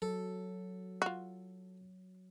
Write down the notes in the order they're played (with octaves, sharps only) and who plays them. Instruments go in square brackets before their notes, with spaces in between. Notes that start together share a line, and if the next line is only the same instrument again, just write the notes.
[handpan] F#3 [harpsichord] A4
[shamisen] F4 F#4